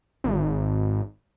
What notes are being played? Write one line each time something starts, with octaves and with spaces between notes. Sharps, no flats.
G#1